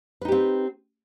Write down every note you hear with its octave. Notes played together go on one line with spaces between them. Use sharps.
C4 D#4 G4 B4